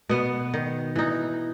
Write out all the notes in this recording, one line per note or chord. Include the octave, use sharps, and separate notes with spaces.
B2 B3
D#3
E3 D#4